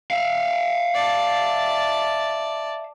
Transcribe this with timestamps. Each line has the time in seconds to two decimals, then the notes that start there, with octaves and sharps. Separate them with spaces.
0.11 E5 F5
0.94 D5 A5